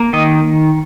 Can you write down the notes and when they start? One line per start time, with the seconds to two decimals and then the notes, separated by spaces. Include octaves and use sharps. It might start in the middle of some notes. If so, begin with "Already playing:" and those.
Already playing: A#3
0.13 D#3 D#5